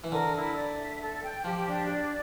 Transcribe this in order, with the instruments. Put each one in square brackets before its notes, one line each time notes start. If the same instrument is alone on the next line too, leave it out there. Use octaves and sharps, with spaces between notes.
[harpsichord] E3
[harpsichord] D3 [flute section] A#4
[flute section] E4
D5
E5
A4
G5
[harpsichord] F3 [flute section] G4
[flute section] D4
D5